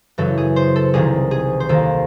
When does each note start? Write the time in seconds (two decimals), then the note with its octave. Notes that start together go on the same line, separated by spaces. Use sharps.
0.18 F#2 C#3 E3 A4
0.38 G#4
0.56 C5
0.76 A4
0.94 C2 C3 D#3 G#4
1.31 G#4
1.60 C5
1.69 D#2 D#3 A4